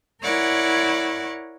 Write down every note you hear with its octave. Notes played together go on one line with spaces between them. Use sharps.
E4 A#4 C#5 D5 F#5